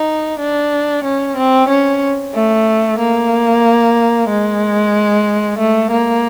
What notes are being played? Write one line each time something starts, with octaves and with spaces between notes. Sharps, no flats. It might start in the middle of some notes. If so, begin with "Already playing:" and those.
Already playing: D#4
D4
C#4
C4
C#4
A3
A#3
G#3
A3
A#3